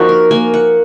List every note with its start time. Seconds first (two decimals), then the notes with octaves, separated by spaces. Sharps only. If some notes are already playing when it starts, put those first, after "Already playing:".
Already playing: F3 A#3 D#4 F#4
0.09 A#4
0.31 A#3 G#5
0.54 F#5